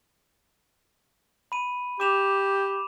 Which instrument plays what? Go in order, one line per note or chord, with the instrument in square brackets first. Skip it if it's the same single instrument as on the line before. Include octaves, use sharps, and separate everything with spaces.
[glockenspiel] B5 D#7
[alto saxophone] G4 [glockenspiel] D6 E7 F7